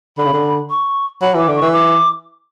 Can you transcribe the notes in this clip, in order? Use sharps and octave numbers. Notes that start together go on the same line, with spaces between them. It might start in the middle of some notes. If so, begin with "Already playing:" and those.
D3 B5
C#3
D3
C#6
F#3 B5
E3 D6
D3
C#6
E3
D6